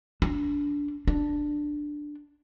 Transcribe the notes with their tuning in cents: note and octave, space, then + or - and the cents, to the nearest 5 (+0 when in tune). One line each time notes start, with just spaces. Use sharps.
D4 -20
D4 +5